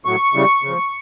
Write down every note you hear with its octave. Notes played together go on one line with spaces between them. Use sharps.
A2 F#3 C#6
C#3 E3 G3
C#3 F3